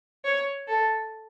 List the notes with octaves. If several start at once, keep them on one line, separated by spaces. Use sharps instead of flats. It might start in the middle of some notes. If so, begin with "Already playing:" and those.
C#5
A4